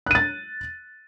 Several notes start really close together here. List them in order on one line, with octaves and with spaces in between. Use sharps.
F#6 D#7 A6